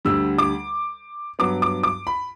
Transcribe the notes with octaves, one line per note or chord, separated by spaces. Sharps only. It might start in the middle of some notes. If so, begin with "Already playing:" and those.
D2 D3 G3 E6
D6
G2 F#3 B3 D6
D6
D6
B5